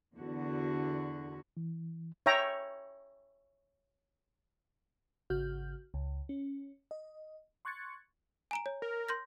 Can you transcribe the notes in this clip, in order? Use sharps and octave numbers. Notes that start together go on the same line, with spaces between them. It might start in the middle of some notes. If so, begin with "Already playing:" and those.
E2 D3 F#4
E3
C#5 E5 G5 A#5
G#1 C#3 F#4 F6 G6
C#2
C#4
D#5
C6 C#6 F#6 G#6 A6 C#7
G#5 A#5 D7
C#5
A#4
C6 G6 A#6